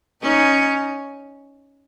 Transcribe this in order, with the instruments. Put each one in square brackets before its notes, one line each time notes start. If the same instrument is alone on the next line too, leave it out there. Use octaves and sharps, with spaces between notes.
[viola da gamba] C#4 D#4